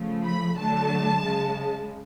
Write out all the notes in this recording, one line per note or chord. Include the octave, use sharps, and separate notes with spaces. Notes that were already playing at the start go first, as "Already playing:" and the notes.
Already playing: C#3 F3 A3
B5
D3 F#3 A3 A5
C#3 G#3